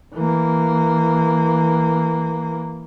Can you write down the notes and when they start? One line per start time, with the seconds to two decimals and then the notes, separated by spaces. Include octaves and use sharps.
0.15 E3 A#3